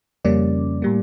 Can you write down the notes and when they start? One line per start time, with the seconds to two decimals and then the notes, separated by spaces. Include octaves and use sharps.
0.24 F2 C#3 G3 A#3 C#4 D5
0.82 A2 G3 A#3